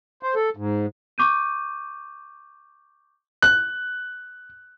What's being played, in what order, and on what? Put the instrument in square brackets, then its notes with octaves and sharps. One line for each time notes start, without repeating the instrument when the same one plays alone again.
[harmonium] C5
A4
G#2
[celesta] C#6 D6 G6 D#7
[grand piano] F#6